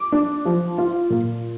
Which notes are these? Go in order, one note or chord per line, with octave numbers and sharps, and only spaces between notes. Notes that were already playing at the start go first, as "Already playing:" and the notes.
Already playing: D6
D4
F3
F4
A#2